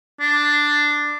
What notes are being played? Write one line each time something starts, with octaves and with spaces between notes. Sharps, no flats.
D4